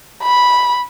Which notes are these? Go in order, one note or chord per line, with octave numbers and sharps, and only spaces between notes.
B5